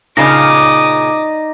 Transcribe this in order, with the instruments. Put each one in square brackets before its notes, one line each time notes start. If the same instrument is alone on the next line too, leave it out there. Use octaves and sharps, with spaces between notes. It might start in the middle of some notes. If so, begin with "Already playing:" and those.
[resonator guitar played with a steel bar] A#2 C#3 [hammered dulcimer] D#4 D5 [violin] D6 D#6 [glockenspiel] A#6